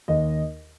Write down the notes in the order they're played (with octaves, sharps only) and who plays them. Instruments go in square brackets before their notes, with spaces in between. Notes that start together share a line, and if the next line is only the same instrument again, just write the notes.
[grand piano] D#2 D#5